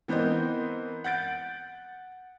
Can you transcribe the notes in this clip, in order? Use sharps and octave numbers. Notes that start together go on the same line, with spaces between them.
E3 B3 C4 A#4 C5 D#5
F#5 G6 A6 D7